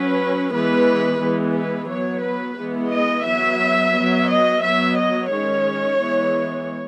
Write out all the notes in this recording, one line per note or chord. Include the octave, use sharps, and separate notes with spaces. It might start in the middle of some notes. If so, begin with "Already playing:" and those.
Already playing: F#3 C#4 B4
E3 G#3 B3 B4
E3 G#3 B3
B4
F#3 B3 C#5
B4
E3 G#3 B3
D#5
F#3 B3 E5
F#3 B3
D#5
F#3 B3 E5
D#5
D#3 G#3 C#4 C#5
E3 G#3 B3